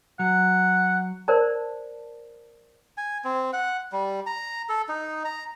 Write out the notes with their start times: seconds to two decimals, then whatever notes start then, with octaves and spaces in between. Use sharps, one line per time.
0.19 F#3 F#5
1.28 A#4 C5 D5 A5
2.97 G#5
3.24 C4
3.53 F#5
3.92 G3
4.27 A#5
4.69 A4
4.89 D#4
5.25 A#5